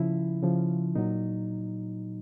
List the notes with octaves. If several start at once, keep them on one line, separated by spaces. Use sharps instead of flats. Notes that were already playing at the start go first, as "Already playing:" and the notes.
Already playing: C#3 F3 E4
C#3 F3
A#2 F#3 D#4